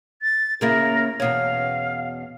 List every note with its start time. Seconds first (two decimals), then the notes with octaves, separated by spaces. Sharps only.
0.22 A6
0.61 C#3 A#3 E4 A#4
1.20 E2 B2 C#4 F5